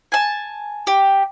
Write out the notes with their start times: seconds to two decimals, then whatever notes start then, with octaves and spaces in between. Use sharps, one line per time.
0.12 G#5 A5
0.87 G4